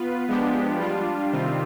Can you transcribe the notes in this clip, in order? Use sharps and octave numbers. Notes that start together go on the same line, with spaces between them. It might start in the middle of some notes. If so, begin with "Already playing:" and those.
Already playing: B3 F4 B4
F3 G#3 B3 D4 G4
G3 D4 F4
C3 D#3 G3 C4 F4